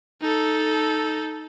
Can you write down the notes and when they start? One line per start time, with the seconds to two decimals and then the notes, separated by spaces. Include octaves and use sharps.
0.21 D#4 A4